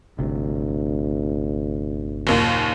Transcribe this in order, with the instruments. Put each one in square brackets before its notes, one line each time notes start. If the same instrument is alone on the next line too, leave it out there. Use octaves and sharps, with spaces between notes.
[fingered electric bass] G1 C3 [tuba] D2
[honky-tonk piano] F#1 D#2 A#2